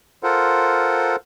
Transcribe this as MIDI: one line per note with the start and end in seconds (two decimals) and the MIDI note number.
0.23 1.16 65
0.23 1.16 69
0.23 1.16 70
0.23 1.16 72
0.23 1.16 78